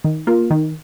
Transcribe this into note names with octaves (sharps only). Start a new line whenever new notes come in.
D#3
A#3 F4 A#4
D#3